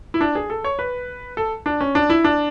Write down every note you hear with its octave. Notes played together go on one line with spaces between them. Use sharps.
E4
D4
G#4
A4
C#5
B4
A4
D4
C#4
D4
E4
D4